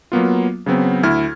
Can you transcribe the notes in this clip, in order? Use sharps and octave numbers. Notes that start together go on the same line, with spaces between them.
F#3 A#3 B3 F4
C#3 F#3 B3 C4
D2 E4 F6 G#6